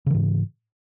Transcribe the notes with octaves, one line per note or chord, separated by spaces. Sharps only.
G#2 C#3 E3